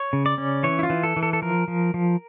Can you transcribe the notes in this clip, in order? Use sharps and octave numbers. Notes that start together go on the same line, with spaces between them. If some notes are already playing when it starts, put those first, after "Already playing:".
Already playing: C#5
C#3
D5
C#4
E3 C#5
E4
F4
E3
A4
E3
A4
A4
F3 A#4
F3
F3